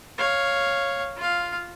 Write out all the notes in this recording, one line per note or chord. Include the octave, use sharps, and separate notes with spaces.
C#5 F5
F4 F5